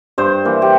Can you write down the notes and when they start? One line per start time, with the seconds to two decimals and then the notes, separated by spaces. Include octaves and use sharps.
0.18 G2 C5
0.45 E3 A#3
0.62 G4